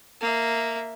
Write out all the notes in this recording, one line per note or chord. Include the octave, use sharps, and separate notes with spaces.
A#3 E5